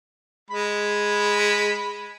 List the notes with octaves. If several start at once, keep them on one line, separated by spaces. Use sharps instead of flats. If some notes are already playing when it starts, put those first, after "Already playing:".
G#3 B5